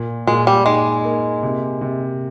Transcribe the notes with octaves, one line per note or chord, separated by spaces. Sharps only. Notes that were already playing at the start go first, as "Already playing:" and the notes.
Already playing: A#2
A#2 G#3
G3
G#3 D#4
A#3
C3
C3